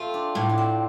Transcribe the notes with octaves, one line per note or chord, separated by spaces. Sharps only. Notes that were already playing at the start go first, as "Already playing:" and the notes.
Already playing: A3 C4 F4
D4
A2 D4
D4
C4